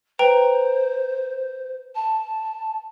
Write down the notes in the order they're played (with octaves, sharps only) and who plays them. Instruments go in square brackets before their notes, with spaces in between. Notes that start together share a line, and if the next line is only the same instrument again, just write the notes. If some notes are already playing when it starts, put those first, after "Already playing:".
[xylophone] B4 G5 A#5 [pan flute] C5
[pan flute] A5